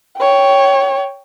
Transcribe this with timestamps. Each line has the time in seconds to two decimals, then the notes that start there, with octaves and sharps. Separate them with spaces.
0.17 C#5 G5